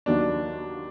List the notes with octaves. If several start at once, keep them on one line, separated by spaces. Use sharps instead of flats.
D#2 D#3 F#3 A#3 D4 D#4